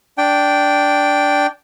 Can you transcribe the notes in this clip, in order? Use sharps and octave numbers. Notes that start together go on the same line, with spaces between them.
D4 G5